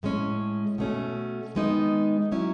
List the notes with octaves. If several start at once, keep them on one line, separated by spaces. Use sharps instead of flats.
A2 G#3 C#4
B2 A3 C#4
D#3 G#3 B3 D#4
F#3 C#4 E4